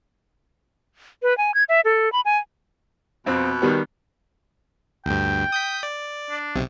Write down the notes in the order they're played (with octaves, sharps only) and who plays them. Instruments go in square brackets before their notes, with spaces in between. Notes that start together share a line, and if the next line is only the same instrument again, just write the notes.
[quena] B4
G#5
G#6
E5
A4
B5
G#5
[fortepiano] F2 C4 [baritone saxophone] B2
[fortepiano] D#3 G3 B3
[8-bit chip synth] D2 G2 [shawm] G5
[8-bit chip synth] D#6 G6 B6
D5
[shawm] D4
[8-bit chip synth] B1 C3